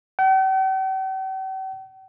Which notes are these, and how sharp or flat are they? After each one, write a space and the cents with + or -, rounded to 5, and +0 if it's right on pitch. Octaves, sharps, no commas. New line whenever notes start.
G5 -45